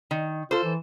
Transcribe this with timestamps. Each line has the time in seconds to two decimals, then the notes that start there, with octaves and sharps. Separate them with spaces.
0.11 D#3
0.51 F4 A4 C5
0.64 E3